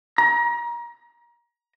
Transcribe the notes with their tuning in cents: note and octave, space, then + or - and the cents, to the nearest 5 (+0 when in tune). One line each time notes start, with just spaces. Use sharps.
A#5 +30